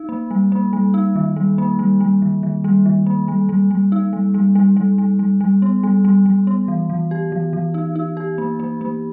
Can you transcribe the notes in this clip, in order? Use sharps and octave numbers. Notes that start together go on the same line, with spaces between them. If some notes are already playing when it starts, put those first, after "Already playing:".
Already playing: D#4
A#3
G3
A#3
G3
D#4
D#3
G3
A#3
G3
G3
D#3
D#3
G3
D#3
A#3
G3
G3
G3
D#4
G3
G3
G3
G3
G3
G3
G3
B3
G3
G3
G3
B3
E3
E3
G4
E3
E3
D#4
D#4
G4
A#3
A#3
A#3